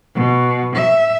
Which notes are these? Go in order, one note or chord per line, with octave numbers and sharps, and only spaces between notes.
B2
E5